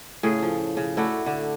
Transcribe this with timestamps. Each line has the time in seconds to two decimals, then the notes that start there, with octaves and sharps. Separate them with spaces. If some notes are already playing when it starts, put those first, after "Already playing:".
0.23 A2 C#3 G#4 F5
0.42 F3
0.77 C#3
0.97 A3 E4 F#4 D5
1.26 D3